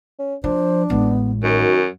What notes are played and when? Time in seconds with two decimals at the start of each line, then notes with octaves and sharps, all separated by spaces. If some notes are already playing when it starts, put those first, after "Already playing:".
0.19 C#4
0.44 F3 D4 C5
0.90 A1 G#3 B3
1.43 F#2 D#3 F#4